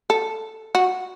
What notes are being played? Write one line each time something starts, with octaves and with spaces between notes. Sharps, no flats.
A4
F#4